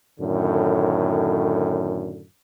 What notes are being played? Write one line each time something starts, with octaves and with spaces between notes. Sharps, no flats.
F#2 A2 D3 D#3